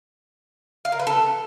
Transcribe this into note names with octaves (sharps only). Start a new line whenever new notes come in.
F5
A#4
B4
A4